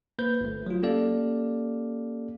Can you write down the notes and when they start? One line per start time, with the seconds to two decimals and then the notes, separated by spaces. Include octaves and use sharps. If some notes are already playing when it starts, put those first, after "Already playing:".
0.19 A#3 B4 C5 G6
0.41 G1 A3
0.66 F#3 F4
0.83 A#3 C#4 G4 A4 D5 F5